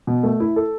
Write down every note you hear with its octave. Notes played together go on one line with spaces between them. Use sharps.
B2
A3
E4
A4